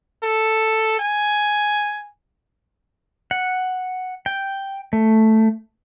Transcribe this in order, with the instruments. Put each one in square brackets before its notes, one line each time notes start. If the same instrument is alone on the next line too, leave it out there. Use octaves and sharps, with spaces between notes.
[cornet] A4
G#5
[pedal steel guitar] F#5
G5
A3